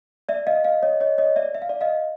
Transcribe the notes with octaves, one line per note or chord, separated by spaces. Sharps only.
D5 E5
D#5 F5
D#5 F5
C#5 D#5
C#5 D#5
C#5 D#5
D5 E5
E5
F5
D5 E5
D#5 F5